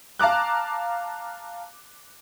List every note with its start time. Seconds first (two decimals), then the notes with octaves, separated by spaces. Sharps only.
0.19 F5 A5 A#5 D6 F#6